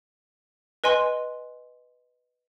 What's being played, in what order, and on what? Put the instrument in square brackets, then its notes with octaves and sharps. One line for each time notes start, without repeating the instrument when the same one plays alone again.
[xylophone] B4 D#5 G#5 C6